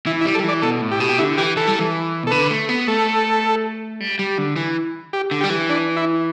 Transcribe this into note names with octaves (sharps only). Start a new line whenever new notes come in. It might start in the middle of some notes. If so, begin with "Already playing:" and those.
E3 E4
E4
G3
A4
G3
E3 D5
B2 A4
A2
G4
B2
G4
D3 E4
E3 G4
E3 A4
G3
E3
B2
A4
D3 B4
A3
B3
A3 A4
G3
G3
D3
E3
G4
D3
G3 G4
E3
D4
E4